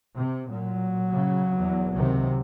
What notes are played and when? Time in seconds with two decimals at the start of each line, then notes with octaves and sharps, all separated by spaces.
0.17 C3
0.51 A#2 F#3
1.10 C#3
1.58 E2
1.94 C#2 C3 D#3